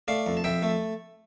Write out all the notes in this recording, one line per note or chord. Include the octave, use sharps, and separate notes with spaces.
A3 D5 F5
F2
A5
F2 E5 G5
A3